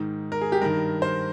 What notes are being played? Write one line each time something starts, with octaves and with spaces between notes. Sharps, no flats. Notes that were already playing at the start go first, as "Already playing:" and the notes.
Already playing: G#2 D#3
A#4
G#4
G4
G2 D#3 A#4
C5